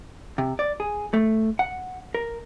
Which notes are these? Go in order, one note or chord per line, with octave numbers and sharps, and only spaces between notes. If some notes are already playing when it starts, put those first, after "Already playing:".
C3
D5
G#4
A3
F#5
A#4